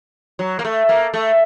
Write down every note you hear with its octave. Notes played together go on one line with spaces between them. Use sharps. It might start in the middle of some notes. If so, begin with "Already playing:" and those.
F#3
A#3
A3
A#3
A3